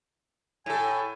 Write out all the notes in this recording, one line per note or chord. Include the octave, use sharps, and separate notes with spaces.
A2 A4 G#5